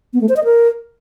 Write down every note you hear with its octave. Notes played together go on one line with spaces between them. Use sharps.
B3
A3
C5
D#5
A#4